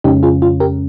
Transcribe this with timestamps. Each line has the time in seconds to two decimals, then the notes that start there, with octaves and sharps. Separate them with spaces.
0.04 F2 C#3 G#3 C#4 D#4 G4
0.23 F4 G#4
0.42 F4
0.60 G4 A#4